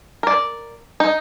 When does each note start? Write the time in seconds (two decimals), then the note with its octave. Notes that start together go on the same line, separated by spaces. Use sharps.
0.23 A#4 D5
1.00 D#4